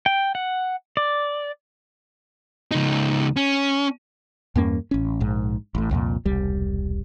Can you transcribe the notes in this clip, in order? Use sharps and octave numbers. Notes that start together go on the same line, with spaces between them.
G5
F#5
D5
C#2 D#4
C#4
E2 G2 A#3 C#4
A1 C#4
A#1 G#2
A1 A2
C2 F2 A#2
E1 C2 G3